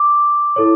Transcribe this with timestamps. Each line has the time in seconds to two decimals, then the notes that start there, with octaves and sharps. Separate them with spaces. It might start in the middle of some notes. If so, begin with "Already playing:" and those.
Already playing: D6
0.56 E4 A4 C#5